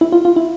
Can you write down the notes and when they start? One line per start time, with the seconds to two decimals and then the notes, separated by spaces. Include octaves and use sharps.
0.01 E4
0.12 F4
0.25 F4
0.36 E4